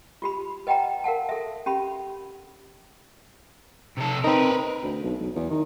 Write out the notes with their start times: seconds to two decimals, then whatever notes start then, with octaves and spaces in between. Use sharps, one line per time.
0.22 F4 G4 B5
0.67 B4 D#5 F#5 G5 A#5
1.04 A#4 F5 F#5 A5
1.29 A4 E5
1.66 C#4 G4 B5
3.98 C3 A4
4.24 C4 D#4 A#4 B4
4.83 D2
5.04 B1
5.20 B1
5.35 E2
5.50 D#3